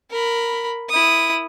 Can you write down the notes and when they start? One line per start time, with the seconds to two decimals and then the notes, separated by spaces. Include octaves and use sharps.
0.11 A#4 B5
0.90 E4 D#6